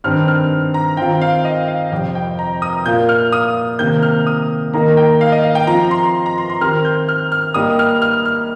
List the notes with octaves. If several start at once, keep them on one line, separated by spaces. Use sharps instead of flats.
G2 D#3 C4 F6
F6
A#5
D#3 C4 F4 G5
F5
D#5
F5
F2 C3 G3 G5
G5
A#5
D#6
A#2 A#3 F4 A#4 G6
F6
D#6
C3 D#3 A#3 G6
F6
D#6
D#3 A#3 D#4 A#4 A#5
G5
F5
D#5
F5
G5
F3 C4 F4 C5 A#5
C6
A#5
C6
C6
D#3 C4 G4 A#4 F6
G6
F6
F6
G3 A#3 D#4 G4 D#6
F6
F6
F6